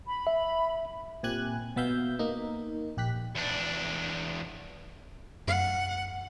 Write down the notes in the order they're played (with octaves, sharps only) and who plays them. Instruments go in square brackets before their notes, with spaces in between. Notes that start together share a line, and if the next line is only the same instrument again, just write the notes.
[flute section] B5
[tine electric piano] E5
[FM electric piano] A#2 C4 G4 G#5 F#6 G#6
B2 B3 E5 F5 G6
A#3 D#4
A#1 G4 F#6 B6
[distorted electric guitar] E2 D4
[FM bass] F#2 [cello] F#5